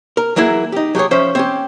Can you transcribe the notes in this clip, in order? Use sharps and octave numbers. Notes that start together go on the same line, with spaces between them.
A#4
E3 F#3 A#3 E4 G#4
D#4 G4
F#3 G4 G#4 C#5
F3 C#4 C5 E5
C4 C#4 G4